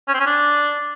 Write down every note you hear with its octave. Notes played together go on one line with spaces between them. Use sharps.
C#4
C4
C#4
D4